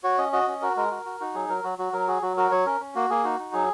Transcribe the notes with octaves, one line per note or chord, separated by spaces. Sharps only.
F#4 C#5
C#4 D#5
F#4 D#5
C#4
F#4 A#4
G#3 A#4
F#4
F#4
D#4 F#4
F#3 G#4
F#3 A#4
F#3 F#4
F#3 F#4
F#3 A#4
F#4 G#4
F#3 F#4
F#4 A#4
F#3 C#5
C#4 A#4
C#4
A#3 F#4
A#3 G#4
D#4 F#4
D#4
F#3 G#4